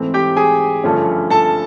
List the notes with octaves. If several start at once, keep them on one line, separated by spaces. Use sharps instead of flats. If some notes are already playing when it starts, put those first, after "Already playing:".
Already playing: G#2 E3 A3 C4
G4 G5
G#4 G#5
G2 D3 F3 A3 C#4
A4 A5